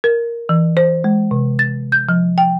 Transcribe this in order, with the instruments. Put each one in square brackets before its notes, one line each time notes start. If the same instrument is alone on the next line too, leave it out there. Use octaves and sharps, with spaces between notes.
[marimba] A#4
E3
C5
G#3
C3
A6
G6
F3
G5